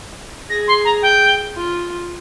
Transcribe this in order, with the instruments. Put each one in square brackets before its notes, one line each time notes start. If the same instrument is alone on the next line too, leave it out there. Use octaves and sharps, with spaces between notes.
[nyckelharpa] G#4 [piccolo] A#6
[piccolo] C6
A#5
G5
[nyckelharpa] F4